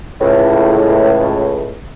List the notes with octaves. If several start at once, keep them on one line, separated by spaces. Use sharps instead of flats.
C#2 A2